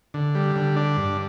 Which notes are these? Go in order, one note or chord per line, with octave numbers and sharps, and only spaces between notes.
D3
G3
D3
D4
G2